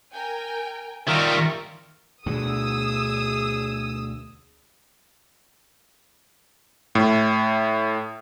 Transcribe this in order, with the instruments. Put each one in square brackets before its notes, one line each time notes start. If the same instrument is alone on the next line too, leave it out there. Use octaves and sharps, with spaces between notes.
[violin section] A#4 G5 G#5
[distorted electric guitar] D#3 G3 [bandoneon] F4 A#4 E5 [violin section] C#6 A#6
[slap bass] D2 B2 D3 [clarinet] G#4 [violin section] D#6 E6
[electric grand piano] A2